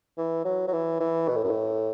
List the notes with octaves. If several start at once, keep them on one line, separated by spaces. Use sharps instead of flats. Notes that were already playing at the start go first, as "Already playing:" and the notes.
E3
F#3
F#3
E3
E3
B2
A2
F#2
A2